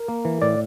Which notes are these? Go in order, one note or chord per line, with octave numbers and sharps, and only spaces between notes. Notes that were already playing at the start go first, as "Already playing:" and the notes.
Already playing: A#4
A#3
E3
A2 D5